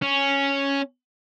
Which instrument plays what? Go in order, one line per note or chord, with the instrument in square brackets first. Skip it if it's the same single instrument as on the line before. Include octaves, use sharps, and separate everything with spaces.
[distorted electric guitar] C#4